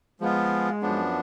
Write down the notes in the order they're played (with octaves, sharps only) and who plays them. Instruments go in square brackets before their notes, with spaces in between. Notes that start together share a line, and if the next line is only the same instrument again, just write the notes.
[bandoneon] F3 B3 F4 [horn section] G#3
[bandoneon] F#2 F3 B3 D4